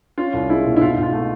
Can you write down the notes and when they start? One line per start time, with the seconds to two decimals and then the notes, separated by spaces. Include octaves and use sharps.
0.18 C#4 F4
0.33 C2
0.49 G#3 E4
0.65 B2
0.76 E4
0.81 G#2 F4
0.97 G#2
1.03 F4
1.13 A3